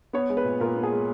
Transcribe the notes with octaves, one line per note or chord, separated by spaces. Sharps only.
B3 C#5
G#3
B4
A#2
A#2 A#4
B3
G#4
G#3